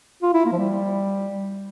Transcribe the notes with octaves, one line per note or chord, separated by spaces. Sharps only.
F4
E4
A#3
F3
G3